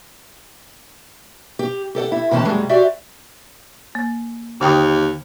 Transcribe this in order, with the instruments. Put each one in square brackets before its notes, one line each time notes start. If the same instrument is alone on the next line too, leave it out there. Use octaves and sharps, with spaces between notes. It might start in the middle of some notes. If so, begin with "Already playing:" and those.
[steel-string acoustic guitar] G4
G4 A4 D5 F#5
E4
C3 D#3 E3 C#4 A5
F#2 C3 G3 G#3 A#3
F#4 G4 C5 D5 E5
[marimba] A#3
[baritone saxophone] D#2 [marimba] D3 G5 D#6